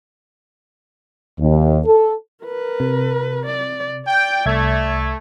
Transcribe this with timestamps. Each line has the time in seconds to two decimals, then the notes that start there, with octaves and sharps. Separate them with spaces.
1.39 D#2
1.86 A4
2.44 A#4 B4
2.80 C3
3.45 D5
4.07 D5 G5
4.46 C2 A3 E5 G#6